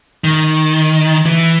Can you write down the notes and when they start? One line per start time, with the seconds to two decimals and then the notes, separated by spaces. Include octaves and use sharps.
0.24 D#3
1.26 E3